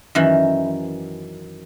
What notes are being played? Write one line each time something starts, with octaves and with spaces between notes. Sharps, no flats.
F#2 D#3 E3